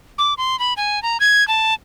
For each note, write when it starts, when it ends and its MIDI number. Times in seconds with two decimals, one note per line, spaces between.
0.18 0.34 86
0.38 0.58 84
0.59 0.74 83
0.77 1.02 80
1.03 1.17 82
1.20 1.46 92
1.48 1.74 81